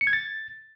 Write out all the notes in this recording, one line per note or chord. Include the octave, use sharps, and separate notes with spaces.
C#7
G#6
A6